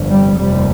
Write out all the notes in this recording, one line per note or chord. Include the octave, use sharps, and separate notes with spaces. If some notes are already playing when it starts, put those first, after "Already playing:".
Already playing: G1 F2 C3
G3
F1 D#2 G3